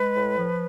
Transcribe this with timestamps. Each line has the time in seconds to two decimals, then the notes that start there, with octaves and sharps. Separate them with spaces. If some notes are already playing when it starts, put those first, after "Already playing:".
Already playing: G#3 B4
0.15 A2
0.36 F3